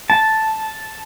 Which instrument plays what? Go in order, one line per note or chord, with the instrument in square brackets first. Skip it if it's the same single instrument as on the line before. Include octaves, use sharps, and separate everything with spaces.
[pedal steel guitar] A5